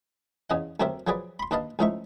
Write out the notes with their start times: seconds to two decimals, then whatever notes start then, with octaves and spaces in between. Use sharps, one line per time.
0.50 E2 C#3 D#5 F#5
0.80 D2 F#3 C4 G4 A#4 E5
1.07 F3 F#3 G#4 B4 D5
1.39 B5 C6
1.51 D#2 D4 B4 D#5 F5 A5
1.79 C#2 A2 F3 D#4 E5 C#6